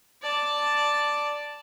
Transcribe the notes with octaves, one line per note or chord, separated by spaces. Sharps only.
D5 A5